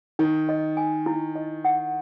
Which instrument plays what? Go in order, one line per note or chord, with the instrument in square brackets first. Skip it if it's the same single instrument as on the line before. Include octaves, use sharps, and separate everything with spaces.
[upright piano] D#3 [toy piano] D#4
[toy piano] D#5
G#5
E4
D#5
F#5